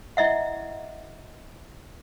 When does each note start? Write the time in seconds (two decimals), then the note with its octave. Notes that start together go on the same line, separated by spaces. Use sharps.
0.17 E4 D#5 E5 F#5